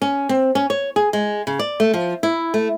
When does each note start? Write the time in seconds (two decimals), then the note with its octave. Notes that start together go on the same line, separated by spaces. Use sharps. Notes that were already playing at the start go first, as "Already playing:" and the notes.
0.02 C#4
0.29 C4
0.55 C#4
0.70 C#5
0.96 G#4
1.13 G#3
1.47 C#3
1.59 D5
1.80 A3
1.94 F3
2.23 E4
2.54 A3